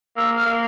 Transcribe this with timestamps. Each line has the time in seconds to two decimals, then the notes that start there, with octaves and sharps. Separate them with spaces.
0.16 A#3 E6
0.36 F6
0.45 A#3